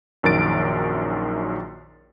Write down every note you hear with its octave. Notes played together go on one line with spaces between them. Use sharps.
A#1 F#2 D#3 A#4 A6 D7